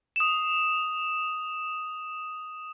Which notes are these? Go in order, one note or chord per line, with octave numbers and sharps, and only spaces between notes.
D#6 E7